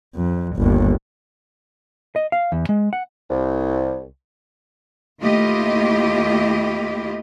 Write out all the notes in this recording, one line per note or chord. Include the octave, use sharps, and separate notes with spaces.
F2
G1 D#2
D#5
F5
E2
G#3
F#5
C2
D#2 A3 E4 F4 G4 D#5